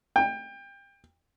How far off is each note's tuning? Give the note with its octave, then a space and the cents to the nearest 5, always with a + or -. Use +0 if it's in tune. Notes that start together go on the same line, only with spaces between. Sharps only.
G5 +25